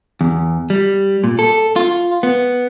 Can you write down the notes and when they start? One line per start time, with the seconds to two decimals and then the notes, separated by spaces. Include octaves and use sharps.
0.21 E2
0.70 G3
1.24 A#2
1.39 A4
1.76 F4
2.23 B3